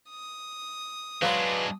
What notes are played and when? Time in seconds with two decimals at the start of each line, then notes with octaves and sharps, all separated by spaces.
0.10 D#6
1.22 F#3 G#3 D4 B4 C5 D5 F5